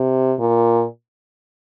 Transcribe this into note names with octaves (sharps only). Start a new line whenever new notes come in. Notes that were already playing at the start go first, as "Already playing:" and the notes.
Already playing: C3
A#2